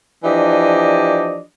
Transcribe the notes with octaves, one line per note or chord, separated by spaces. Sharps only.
E3 F3 D4 G4 D5 D#5